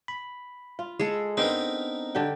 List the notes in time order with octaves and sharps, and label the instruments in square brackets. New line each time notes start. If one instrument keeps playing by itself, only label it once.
[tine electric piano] B5
[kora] F4
[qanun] G#3 A4
[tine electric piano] B3 C4 D4 [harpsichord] D#4 A#4 B4 [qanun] G5
[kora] D3 G4 G5